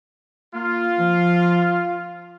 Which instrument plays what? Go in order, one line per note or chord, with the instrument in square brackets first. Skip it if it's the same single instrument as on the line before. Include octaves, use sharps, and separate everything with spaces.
[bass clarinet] A#3 [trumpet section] F4
[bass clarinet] F3